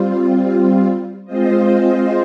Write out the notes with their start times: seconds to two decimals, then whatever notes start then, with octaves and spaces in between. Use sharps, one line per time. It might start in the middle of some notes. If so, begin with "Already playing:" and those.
Already playing: G3 C4 F4
1.25 G#3 C4 F4 C5 D#5